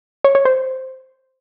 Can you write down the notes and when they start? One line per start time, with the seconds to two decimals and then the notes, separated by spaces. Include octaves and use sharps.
0.24 C#5
0.35 C#5
0.45 C5